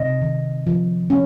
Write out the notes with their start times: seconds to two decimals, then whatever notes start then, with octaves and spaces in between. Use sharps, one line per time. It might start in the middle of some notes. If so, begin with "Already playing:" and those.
Already playing: C3 D#5
0.22 D#3
0.67 F3
1.10 C#4